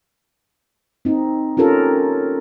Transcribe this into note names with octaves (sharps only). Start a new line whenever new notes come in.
C4 D#4
C#4 F4 G4 A4 A#4